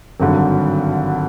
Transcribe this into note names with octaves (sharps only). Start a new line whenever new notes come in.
G#1 G2 D3 F#3